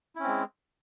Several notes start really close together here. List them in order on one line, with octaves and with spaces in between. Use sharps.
E4 C#4 C4 G#3